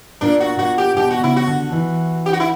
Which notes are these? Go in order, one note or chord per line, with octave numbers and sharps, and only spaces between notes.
A#2 D4
F#4
A#2 F#4
G4
B2 G4
F#4
C#3 E4
F#4
D3
E3
G4
F#4
E4